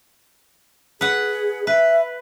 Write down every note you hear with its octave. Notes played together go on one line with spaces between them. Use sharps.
G#4 B4 F#5
B4 E5